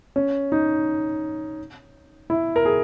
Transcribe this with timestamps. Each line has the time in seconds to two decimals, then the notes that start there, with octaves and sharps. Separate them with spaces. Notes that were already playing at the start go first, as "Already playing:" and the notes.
0.16 C#4
0.52 D#4
2.30 E4
2.56 A#4
2.65 G#4